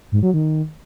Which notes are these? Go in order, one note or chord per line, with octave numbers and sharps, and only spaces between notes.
G#2
F#3
D#3